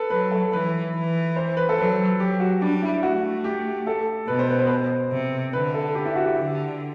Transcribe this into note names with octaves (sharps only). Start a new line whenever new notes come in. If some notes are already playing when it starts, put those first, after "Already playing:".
Already playing: A4 B4
F#3 B4
A4
E3 B4
E3
C5
B4
A4
F#3 B4
F#3 G4
F#4
G3 D4
E4
A3 F#4
G4
A4
B2 B4
C5
B4
C5
B4
C5
C3
D3 B4
A4
G4
E4
F#4
G4
D3